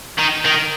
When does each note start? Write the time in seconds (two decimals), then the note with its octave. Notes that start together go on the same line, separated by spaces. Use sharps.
0.18 D#3
0.45 D#3